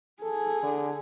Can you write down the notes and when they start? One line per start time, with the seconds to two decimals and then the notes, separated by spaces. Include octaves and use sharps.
0.22 G#4 A4
0.63 D3